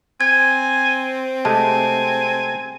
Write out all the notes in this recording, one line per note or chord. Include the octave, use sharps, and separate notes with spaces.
C4 G#5 G#6
C3 G#3 A3 G#5 A5